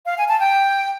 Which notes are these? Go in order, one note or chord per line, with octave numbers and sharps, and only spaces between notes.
F5
G#5
A5
G5